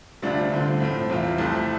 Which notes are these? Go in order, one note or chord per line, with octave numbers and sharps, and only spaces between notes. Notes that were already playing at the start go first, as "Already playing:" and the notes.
D2 C3 G3 D4 F4
G2 D3 A3 C4 F4
A2 F3 A3 C4
E2 C3 G3 C4 F4
C2 C3 F3 A3 E4